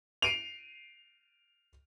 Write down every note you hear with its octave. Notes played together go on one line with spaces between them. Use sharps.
C7 D7 D#7 F7